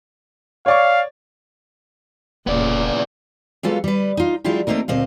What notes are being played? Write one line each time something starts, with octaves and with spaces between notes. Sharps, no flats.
C#5 D5 F5 C#6
E1 A#2 C#3 B3 D5
F#3 G#3 B3 F4 A4 F5
G3 B4
D#4 F4
F#3 G#3 D4 E4 F4 G4
A3 A#3 C4 D#4 A#4
D2 A#2 C4 D#5 F5